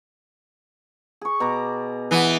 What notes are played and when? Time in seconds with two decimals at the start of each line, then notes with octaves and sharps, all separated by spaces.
1.21 G#4 C#6
1.40 B2 A#5 D6
2.11 E3 B3